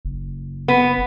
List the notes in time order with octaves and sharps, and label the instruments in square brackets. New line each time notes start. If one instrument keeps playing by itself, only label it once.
[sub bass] F#1
[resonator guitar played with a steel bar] B3